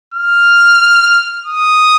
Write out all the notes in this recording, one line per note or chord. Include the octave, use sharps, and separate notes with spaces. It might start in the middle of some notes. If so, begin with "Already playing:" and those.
F6
D#6